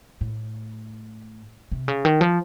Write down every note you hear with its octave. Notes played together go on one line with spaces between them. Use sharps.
A2
C3
C#3
D#3
F3